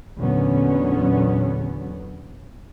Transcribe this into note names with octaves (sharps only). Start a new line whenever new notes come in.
E2 A#2 D3 F#3 B3 C#4